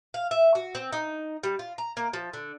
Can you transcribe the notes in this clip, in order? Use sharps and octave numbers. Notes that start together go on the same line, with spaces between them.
F5
E5
F#4
C4
D#4
G3
F4
A#5
A#3
F3
D3